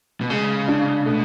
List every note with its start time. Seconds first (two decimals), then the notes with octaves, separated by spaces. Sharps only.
0.21 B2
0.30 C#3 G#3
0.68 D4
1.06 B2 A3